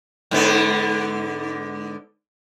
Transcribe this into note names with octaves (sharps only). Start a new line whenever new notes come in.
G#2 D3 B3